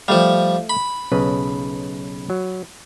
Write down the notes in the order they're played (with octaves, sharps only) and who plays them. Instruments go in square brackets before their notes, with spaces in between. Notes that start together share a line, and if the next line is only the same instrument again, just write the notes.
[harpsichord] F3 G3 [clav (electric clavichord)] A3 F5
[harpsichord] B5
[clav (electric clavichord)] B1 C#3 B4
F#3